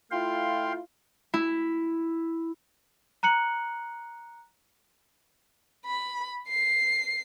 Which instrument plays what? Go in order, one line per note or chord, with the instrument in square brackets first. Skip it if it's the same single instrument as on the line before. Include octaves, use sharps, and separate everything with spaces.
[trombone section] A3 E4 F4 [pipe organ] F5 G5 C6
[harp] E4
[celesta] A#5 F#6 C#7 F#7
[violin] B5
C7